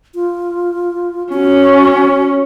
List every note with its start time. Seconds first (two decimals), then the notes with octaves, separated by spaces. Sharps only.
0.15 F4
1.33 C#4 F#4